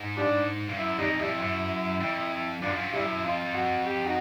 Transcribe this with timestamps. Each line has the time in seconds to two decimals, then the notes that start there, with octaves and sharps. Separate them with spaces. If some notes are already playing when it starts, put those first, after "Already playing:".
Already playing: G#2
0.17 F3 G3 D4
0.69 G2
0.78 F#2 E4
0.98 F2 G3 D#4
1.19 F2 G3 E4
1.40 F#2
2.01 F2
2.62 F#2 D4 F4
2.75 F#2
2.83 G2
2.93 G2 G3 E4
3.03 F#2
3.24 F2 F4
3.54 F#4
3.85 G4
4.05 D#4 F#4